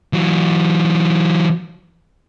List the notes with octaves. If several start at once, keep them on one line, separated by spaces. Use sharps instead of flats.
E3 F#3